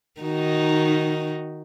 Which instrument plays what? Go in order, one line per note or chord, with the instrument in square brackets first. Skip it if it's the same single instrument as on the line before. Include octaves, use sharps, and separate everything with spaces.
[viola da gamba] D#3 D#4 F#4